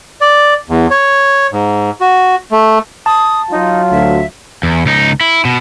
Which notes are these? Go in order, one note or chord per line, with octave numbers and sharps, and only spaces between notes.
D5
E2
C#5
G#2
F#4
A3
A5 D#6
F#3 D#4 F4
D2 E5
E2
C#2 D#4
E4
B2